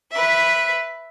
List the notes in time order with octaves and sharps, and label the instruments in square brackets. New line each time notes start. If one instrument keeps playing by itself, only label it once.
[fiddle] B4 E5